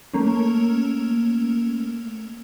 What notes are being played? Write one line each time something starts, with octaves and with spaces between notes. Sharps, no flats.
A3 A#3 C#4